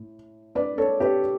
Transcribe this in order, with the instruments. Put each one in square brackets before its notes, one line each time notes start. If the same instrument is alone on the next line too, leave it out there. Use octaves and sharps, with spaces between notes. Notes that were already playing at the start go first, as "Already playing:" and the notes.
Already playing: [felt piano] A2
B4 D5
A4 C#5
G4 B4